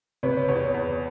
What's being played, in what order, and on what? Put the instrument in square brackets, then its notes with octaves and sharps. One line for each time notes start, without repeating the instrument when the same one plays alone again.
[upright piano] C3 [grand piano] B4 C#5
[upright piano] E2 [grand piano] B4 C#5
[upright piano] E2